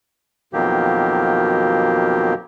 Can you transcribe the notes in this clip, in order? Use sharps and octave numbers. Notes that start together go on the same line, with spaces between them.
F2 B2 D#3 F#3 A#3 G4